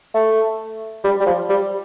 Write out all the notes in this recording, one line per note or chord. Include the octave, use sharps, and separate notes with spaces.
A3
G3
G3
F3
G3